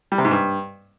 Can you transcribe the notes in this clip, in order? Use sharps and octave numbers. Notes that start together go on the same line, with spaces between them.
G3
C3
G#2
G2